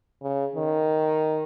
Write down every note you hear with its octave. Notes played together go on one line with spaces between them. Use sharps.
C#3
D#3